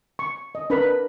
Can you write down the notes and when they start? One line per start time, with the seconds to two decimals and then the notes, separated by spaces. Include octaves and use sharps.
0.19 C#6
0.55 D#5
0.70 D4 A#4 B4 B5